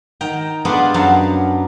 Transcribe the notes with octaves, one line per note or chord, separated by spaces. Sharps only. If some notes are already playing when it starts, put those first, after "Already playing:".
D#3 G5 A#5
G3 B3 D4 F4 G#4 D#5
F#2 F#3 F5 A5